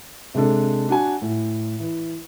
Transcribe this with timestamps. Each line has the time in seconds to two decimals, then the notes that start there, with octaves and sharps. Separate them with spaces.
0.35 C3 G#3 D4 A4
0.89 D4 F#4 G#5
1.22 A2
1.80 E3